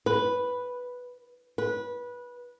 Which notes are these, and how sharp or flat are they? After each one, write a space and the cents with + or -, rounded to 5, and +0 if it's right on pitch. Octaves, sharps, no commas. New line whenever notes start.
B4 +0
B4 -20